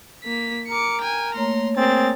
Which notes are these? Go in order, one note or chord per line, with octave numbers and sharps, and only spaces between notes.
A#3 B6
A#4 D6 C#7
G5 G#5
A3 A#3 C#5 A#5 C6
C4 G#4 A#4 A6